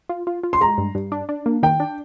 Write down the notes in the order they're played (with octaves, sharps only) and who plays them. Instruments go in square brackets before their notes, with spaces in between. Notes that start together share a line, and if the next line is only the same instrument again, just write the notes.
[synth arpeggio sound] F4
F4
F4
[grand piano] C6
[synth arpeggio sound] G#3 [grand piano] A#5
[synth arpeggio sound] G2
G2
D4
D4
A#3
[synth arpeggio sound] D#3 [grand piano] G5
[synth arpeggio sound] D4